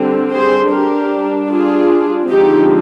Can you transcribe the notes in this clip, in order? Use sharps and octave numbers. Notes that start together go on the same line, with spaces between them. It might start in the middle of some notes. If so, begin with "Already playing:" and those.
Already playing: D3 G3 C4
G#4 C5
G3 D4 G4 A#4
F4 G#4
D3 F3 G#3 C4 D#4 G4